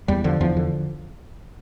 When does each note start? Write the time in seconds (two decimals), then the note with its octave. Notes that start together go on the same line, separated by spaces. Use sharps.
0.08 E2 G3
0.24 D3 F3
0.40 E2 F3
0.57 D3